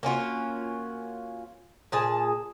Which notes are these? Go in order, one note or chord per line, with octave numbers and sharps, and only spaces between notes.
A#3 C#4 F4 F#4
A#2 G#4 A5